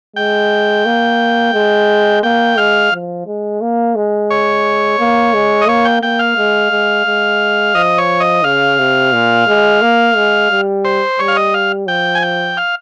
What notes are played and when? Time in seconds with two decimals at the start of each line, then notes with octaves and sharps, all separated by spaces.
0.16 G#3 G5
0.86 A#3
1.54 G#3
2.23 A#3 G5
2.58 G#3 F5
2.93 F3
3.27 G#3
3.61 A#3
3.96 G#3
4.30 C#5
4.99 A#3
5.34 G#3
5.61 D#5
5.68 A#3 C#5
5.85 G5
6.02 A#3 G5
6.19 F5
6.37 G#3
6.71 G#3
7.06 G#3
7.75 F3 D#5
7.98 C#5
8.20 D#5
8.44 C#3 F5
8.79 C3
9.13 A#2
9.47 G#3
9.82 A#3
10.16 G#3
10.51 G3
10.85 C5
11.19 G3 C#5
11.28 F5
11.36 D#5
11.54 F5
11.88 F3 G5
12.15 G#5
12.22 G5
12.57 F5